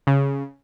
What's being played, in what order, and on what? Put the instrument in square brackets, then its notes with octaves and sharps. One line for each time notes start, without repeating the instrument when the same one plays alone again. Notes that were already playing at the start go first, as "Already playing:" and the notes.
[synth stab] C#3